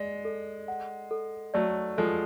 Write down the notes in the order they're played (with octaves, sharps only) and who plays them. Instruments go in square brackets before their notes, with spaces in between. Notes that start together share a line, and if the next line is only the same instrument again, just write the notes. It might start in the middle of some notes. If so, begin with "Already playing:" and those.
Already playing: [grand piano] G#3 [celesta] D5
[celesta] A4
F#5
A4
[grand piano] F#3 A3 [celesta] D5
[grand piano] F3 G#3 [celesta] A4